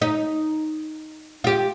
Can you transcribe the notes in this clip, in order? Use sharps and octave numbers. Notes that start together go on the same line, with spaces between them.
D#4
F4 G4